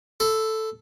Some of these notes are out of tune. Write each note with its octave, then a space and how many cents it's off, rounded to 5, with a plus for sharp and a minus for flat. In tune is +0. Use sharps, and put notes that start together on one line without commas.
A4 +0 B5 +40